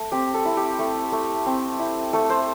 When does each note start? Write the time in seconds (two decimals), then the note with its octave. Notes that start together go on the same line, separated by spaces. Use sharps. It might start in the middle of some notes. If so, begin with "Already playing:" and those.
Already playing: A3
0.11 C4 G4
0.34 A4
0.45 E4
0.57 G4
0.79 A3
1.12 A3
1.46 C4
1.79 E4
2.13 A3 A4
2.29 C5